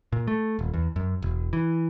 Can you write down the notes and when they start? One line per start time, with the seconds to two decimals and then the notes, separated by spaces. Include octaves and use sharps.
0.12 A#2
0.27 A3
0.59 D#1
0.74 E2
0.96 F#2
1.22 E1
1.53 E3